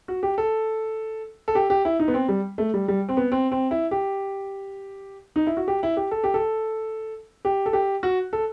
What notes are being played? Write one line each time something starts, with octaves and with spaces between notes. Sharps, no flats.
F#4
G4
A4
A4
G4
G4
E4
D#4
B3
C4
G3
A3
G3
G3
C4
B3
C4
C4
E4
G4
D#4
E4
F#4
G4
E4
G4
A4
G4
A4
G4
A4
G4
F#4
A4